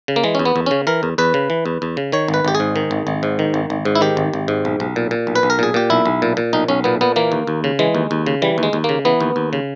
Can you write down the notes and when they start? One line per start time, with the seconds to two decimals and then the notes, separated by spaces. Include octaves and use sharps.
0.08 C#3
0.16 A#3
0.23 E3 G#3
0.35 C#4
0.39 E2
0.45 B3
0.56 E2
0.66 C#3 C#4
0.87 E3 A#4
1.03 E2
1.18 E2 B4
1.34 C#3
1.50 E3
1.66 E2
1.82 E2
1.97 C#3
2.12 D#3 C#5
2.28 G#1
2.34 B4
2.45 G#1 G4
2.55 G#4
2.60 G#2
2.76 D#3
2.91 G#1
3.07 G#1
3.23 G#2
3.39 D#3
3.54 G#1
3.70 G#1
3.85 G#2
3.95 E4
4.01 D#3 G4
4.17 G#1
4.34 G#1
4.48 G#2
4.65 B1
4.80 B1
4.96 A#2
5.11 A#2
5.27 B1
5.35 B4
5.43 B1
5.50 A#4
5.59 A#2 G#4
5.74 A#2 G4
5.90 B1 E4
6.06 B1
6.22 A#2
6.37 A#2
6.53 B1 D#4
6.68 B1 C#4
6.84 A#2 B3
7.01 A#2 B3
7.16 E3 A#3
7.32 D#2
7.47 D#2
7.64 C#3
7.79 E3 G#3
7.95 D#2
8.11 D#2
8.26 C#3
8.42 E3 G3
8.58 D#2
8.63 G#3
8.73 D#2
8.84 C#3 A#3
9.05 E3 B3
9.20 D#2
9.36 D#2
9.53 C#3